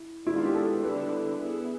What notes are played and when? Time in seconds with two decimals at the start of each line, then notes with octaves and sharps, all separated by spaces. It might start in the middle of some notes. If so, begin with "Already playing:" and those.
Already playing: E4
0.26 D#3 G#3 B3 D4 E4 F#4
0.36 F4
0.45 G4
0.54 A4
0.82 D3 G3 B3 E4 B4
1.38 B3 E4 G#4